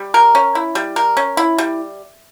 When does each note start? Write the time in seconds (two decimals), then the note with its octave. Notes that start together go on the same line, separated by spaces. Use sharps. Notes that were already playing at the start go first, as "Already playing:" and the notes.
Already playing: G3
0.14 A#4
0.35 C#4
0.55 E4
0.75 G3
0.96 A#4
1.17 C#4
1.37 E4
1.58 G3